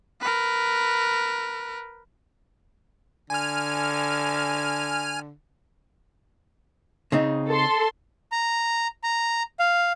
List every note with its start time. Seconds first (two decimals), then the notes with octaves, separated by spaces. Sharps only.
0.21 A#4 B4
3.30 D3 G#5 F6
7.12 C#3 C4 D#4
7.49 A4 C6
8.32 A#5
9.03 A#5
9.59 F5